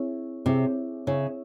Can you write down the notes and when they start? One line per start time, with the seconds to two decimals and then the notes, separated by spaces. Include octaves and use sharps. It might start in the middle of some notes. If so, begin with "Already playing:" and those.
Already playing: C4 E4 G#4 C#5 E5
0.46 C3 C4 E4 G#4 C#5 E5
1.07 C#3 C4 E4 G#4 C#5 E5